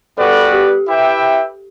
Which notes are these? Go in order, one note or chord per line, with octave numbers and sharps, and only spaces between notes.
G3 B3 F#4 A4 B4 D5
G4
E4 G4 B4 E5 G5